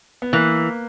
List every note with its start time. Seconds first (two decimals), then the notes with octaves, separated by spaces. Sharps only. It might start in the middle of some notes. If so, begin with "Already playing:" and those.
0.22 B3
0.33 E3 A#3